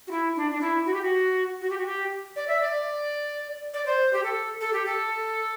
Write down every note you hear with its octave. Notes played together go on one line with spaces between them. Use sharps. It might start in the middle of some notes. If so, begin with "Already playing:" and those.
F#4
E4
D4
D4
E4
F#4
G4
F#4
F#4
G4
F#4
G4
D5
E5
D5
D5
C5
G4
A4
A4
G4
A4